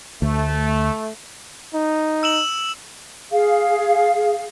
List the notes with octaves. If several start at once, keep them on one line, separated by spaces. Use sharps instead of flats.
D2 A3
D#4
E6 E7 F#7
G#4 F5